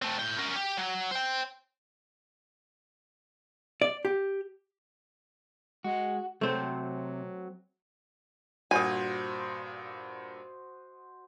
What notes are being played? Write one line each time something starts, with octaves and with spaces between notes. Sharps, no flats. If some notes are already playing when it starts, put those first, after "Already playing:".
A3 C4
A2 G5
C#4 A#4
G4
F#3
C5 G5
D5
G4
G#3 F#4
C3 F#3 A3 C4
G2 A#2 F#4 C5 D#5 G#5